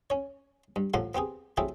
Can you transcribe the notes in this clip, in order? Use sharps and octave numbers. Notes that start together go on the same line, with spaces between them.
C#4 C#5
G2
A1 A2 F3 A4 F#5 C6
B3 C4 G4 G#4
F#3 A3 C4 E4 G4 G#4